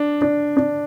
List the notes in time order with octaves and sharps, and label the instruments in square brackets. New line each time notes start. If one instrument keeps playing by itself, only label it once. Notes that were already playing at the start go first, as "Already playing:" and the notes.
Already playing: [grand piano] D4
D4
D4